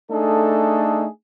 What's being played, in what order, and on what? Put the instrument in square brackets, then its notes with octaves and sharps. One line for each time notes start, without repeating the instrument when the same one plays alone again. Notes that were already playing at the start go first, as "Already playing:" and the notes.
[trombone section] A3 D4 D#4 G#4 A4